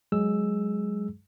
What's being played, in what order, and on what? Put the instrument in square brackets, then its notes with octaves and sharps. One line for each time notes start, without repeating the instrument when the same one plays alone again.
[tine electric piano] F#3 G#3 G#4 E6